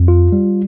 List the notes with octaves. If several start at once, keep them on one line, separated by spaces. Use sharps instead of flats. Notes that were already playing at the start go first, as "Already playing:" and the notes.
Already playing: F2
F4
G3